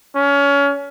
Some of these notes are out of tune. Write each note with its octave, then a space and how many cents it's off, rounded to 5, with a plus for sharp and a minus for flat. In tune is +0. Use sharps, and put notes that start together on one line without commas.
C#4 +25